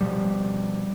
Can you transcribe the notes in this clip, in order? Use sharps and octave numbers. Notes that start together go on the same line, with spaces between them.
B2 F3 G3